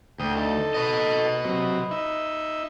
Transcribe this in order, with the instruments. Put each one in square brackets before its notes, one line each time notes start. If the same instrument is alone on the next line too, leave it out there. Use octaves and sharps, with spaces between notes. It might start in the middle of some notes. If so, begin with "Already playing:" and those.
[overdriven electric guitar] D2 [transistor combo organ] G5 D#6
[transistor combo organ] D#4 A4
[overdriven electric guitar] B4 D#5
[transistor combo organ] C3 F#3
D#4 E5